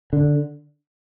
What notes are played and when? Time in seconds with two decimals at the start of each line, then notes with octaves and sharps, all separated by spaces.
0.13 D3